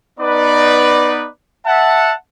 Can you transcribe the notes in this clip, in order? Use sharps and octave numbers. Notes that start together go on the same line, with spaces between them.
B3 D#4 B4 D5
E5 F#5 A5